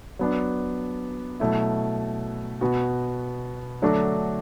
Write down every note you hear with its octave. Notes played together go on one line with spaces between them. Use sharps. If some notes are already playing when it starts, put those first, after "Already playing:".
F#3 B3 D4
B2 F#3 A3 E4
B2 B3 F#4
D3 F#3 A3 D4 F#4